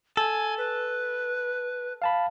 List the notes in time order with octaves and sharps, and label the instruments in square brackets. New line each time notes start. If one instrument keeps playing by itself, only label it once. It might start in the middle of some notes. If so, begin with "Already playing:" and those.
[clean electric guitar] A4 [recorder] G#5
[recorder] B4
[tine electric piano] F5 A5 B5